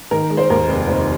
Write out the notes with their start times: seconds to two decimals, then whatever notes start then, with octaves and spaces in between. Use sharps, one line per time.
0.11 D#3 A#4
0.30 G#3
0.37 C5
0.50 D#2 A#4
0.68 F1
0.87 D#3 C5